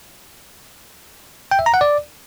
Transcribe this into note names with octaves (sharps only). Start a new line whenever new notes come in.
G5
E5
A#5
F#5
D5